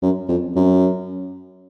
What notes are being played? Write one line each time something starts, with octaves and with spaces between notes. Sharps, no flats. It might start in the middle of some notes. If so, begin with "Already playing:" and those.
F#2
F2
F#2